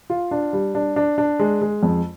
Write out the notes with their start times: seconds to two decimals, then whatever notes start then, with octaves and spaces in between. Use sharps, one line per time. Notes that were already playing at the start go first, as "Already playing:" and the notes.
0.10 F4
0.31 D4
0.53 G3
0.75 D4
0.96 D4
1.18 D4
1.39 G#3
1.61 G#3
1.83 F2